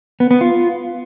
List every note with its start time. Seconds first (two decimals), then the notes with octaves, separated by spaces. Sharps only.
0.20 B3
0.31 B3
0.41 F4